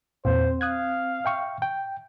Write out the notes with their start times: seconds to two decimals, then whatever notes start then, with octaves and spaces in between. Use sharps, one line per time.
0.25 E2 A#2 C4 C5
0.61 F5 D#6 F#6 G#6
1.25 E5 G5 C#6
1.62 G5